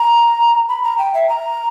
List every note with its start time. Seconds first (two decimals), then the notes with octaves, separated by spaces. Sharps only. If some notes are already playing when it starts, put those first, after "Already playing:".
Already playing: A#5
0.69 B5
0.84 A#5
0.98 G5
1.14 E5
1.29 A#5